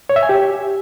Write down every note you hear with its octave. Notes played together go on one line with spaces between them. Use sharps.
C#5
E5
G#5
G4